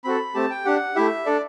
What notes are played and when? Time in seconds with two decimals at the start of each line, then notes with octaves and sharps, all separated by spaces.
0.04 C4 F#4 A4 B5
0.34 A3 C4 G4 A5
0.50 G5
0.65 D4 G4 F#5
0.96 A3 E4 G4 E5
1.26 D4 A4 D5